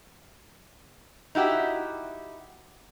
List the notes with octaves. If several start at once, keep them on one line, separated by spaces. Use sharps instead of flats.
D#4 E4 F#4 G4